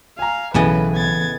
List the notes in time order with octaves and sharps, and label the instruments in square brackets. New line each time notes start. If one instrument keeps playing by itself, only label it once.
[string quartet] F5 [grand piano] G#5 A#5
[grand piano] B1 [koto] A2 C#3 D#5 [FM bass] E3 [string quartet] B4
[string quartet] B3 G#6 A6